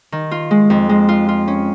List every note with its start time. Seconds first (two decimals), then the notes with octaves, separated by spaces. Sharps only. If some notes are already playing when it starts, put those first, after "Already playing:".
0.12 D#3
0.31 F4
0.51 G#3
0.70 F2
0.89 G#3
1.09 F4
1.29 F4
1.48 C#4